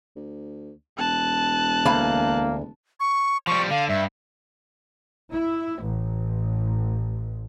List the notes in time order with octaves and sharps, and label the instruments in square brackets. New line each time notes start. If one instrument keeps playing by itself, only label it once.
[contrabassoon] D2
[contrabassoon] E1 [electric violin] A5 F#6
[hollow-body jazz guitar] D2 F5 B5 [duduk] A#3
[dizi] C#6
[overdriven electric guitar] F3 G3 [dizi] C#6
[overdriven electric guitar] D3 [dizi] F5
[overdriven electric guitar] G2 [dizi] E5
[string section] E4
A1